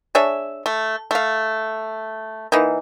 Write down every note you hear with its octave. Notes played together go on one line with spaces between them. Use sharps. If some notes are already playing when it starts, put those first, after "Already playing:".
D4 G#4 C#5 E5
A3
A3 F5
E3 A#3 D#4